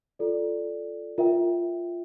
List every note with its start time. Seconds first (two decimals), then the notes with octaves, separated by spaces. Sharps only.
0.19 F4 A4 D5
1.18 F4 A#4 E5 G5